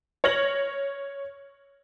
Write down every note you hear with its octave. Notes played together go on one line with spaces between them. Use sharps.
C#5 F6 A#6 F#7